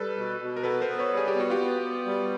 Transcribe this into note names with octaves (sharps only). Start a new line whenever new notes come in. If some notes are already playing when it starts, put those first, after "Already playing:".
Already playing: G3 A4 B4
B2
B2
A#4
B3 A4 B4
A#4 C5
B3
B4 C#5
G3
G#4
G4
B3 F#4
F4 G4
B3
B3
G3